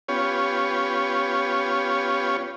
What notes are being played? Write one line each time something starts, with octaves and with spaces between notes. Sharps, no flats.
B3 C#4 F4 G4 C#5